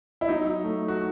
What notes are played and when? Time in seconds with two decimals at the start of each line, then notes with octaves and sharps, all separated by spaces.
0.21 E4
0.28 F#3 D#4
0.63 A3
0.88 F#4